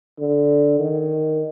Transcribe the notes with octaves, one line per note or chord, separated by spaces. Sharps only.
D3
D#3